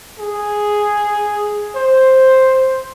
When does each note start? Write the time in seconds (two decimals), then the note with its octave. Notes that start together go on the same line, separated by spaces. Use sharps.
0.19 G#4
1.75 C5